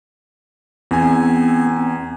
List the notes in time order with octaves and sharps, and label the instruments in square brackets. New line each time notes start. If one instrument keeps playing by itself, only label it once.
[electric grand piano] E2 G#5 [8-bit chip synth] B3 C4